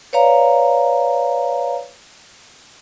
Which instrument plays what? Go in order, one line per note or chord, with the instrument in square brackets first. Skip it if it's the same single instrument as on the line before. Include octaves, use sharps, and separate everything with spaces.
[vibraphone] B4 C#5 D5 F5 A#5